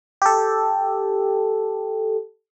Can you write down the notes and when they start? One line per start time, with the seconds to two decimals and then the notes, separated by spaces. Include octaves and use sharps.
0.22 G4 A4